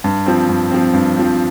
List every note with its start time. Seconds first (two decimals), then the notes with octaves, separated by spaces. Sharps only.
0.04 G2
0.26 F3 C4
0.49 G2
0.71 F3 C4
0.93 G2
1.17 F3 C4